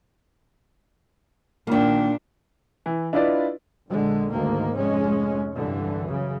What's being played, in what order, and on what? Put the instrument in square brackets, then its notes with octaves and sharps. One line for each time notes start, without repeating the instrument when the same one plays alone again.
[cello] A#2 D4 [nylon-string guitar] D#3 A#3
[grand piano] E3
D4 E4 F4 B4 D5 D#5
[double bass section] A#1 D3 G#3
D2 G#2 D#3 A#3
F1 G#3 C#4
C2 G2 D3 E3
F#2 C#3